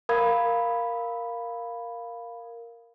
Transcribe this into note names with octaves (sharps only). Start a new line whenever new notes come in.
A#4 F5 B5 D#6 G#6